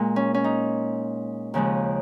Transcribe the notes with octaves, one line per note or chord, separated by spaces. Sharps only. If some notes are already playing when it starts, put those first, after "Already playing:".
Already playing: A#2 G#3
C#4
C#4
D#4
D#2 C#3 F3 G#3